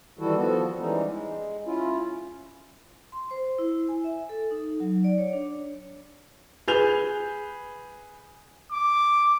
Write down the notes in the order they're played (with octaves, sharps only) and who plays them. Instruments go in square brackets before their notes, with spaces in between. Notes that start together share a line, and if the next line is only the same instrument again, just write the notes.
[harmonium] D#3 E3 G3 E4 F#4 A4
F3 B3 F#4 A4
E3 G3 G#3 C#4 D#4
G#3
C#4 E4 F4
[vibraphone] C6
C5
E4
G#5
E5
A4
D#4
F#3
D5
C#5
D4
[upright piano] G#4 B4 G6 F7
[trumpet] D6